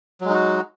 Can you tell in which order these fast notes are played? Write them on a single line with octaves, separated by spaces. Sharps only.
F#3 G#3 D#4 F#4